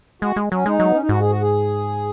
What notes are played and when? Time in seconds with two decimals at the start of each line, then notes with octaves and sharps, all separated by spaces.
0.22 G#3 F#4
0.36 G#3
0.52 F#3 C#4
0.66 G#3 D#4
0.79 F#3 G#3
0.87 B3
0.94 C#4
1.01 D#4
1.09 G#2 F#4
1.20 G#4
1.30 F#4
1.41 G#4